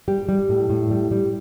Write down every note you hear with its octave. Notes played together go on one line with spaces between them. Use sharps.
G3 G4
G3
A2
A2
G3
G3